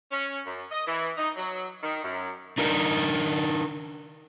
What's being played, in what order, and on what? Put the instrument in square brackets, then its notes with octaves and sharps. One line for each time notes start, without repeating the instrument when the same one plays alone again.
[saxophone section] C#4
F#2
D#5
E3
D#4
F#3
D#3
F#2
[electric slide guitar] D4 D#4 A#4